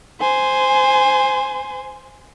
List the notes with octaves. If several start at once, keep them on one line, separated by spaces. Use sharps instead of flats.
C5 G#5